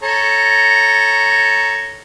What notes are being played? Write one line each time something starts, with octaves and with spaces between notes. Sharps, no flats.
A4 C#5 A#5